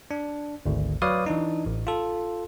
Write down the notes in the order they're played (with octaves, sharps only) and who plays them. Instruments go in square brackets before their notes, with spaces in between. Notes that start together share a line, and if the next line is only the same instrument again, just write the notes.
[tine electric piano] D4
G#1 D2
F#3 B4 C#5 D5 F5 D#6
E3 D4 D#4
A1
F4 A4